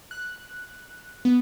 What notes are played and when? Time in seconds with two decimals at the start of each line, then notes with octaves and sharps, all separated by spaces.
0.11 F#6
1.25 B3